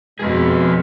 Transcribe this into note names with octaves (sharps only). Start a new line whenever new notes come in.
F2 B2 G#3 G#4 B4